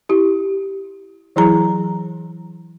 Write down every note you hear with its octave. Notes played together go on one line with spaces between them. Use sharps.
E4 G4
E3 F#3 E4 G#4 A#5